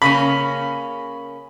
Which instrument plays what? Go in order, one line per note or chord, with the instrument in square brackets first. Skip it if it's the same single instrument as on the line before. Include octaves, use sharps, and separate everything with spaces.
[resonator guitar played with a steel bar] C#3 A#3 C#4 [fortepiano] B5